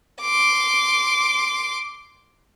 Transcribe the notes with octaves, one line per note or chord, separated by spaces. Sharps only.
C6 D6